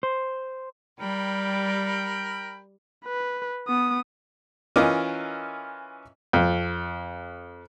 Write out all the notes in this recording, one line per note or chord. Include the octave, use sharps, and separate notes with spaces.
C5
G3 A#4 G5 B5
B4
B3 D#6
E3 C#4 F4 A#4 D#5 D6
F2